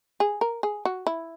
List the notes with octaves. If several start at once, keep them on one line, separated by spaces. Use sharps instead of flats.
G#4
A#4
G#4
F#4
E4